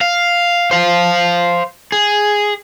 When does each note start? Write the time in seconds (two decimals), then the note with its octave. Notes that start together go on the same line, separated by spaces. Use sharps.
0.01 F5
0.71 C5 F5
1.92 G#4